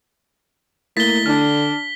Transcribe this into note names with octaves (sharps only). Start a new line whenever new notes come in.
A3 A#3 E4 A6 B6 G7
D3 D4 F6